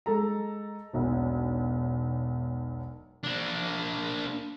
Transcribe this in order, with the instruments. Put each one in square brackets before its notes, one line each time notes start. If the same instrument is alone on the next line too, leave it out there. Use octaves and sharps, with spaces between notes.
[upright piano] G#3 A4 A#5
E1 B1
[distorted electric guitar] A#3 D4